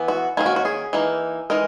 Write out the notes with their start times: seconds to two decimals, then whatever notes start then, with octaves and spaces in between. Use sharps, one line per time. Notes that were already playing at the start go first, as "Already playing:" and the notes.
Already playing: E3 B3
0.08 F#4
0.37 D#3 A#3 C#4 E4
0.46 F#4
0.56 F#4
0.65 G#4
0.93 E3 A#3 D#4
1.50 E3 G#3 D#4 A#4